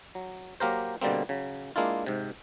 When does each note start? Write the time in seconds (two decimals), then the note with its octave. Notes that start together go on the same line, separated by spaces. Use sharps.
0.15 F#3
0.60 F#3 A#3 G4 A#4 C5
1.01 B2 D3 G3 A#3 C4
1.29 C#3 F#3
1.76 G#3 A#3 D4 E4 F4
2.06 G#2 C3